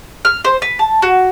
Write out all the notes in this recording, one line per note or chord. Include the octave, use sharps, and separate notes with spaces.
F6
C5
B4
A5
F#4